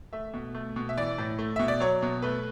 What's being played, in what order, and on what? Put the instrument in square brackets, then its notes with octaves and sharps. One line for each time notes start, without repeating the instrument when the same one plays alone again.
[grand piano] A3 E5
B2
A3
B2
E5
E3 D5
A2
A3
B2 E5
D5
F#3 C#5
B2
A3 B4